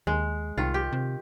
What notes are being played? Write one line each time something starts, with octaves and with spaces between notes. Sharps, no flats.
D#2 G#3
C2 D#3 F4
G4
C3